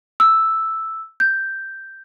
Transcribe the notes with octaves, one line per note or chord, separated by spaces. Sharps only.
E6
G6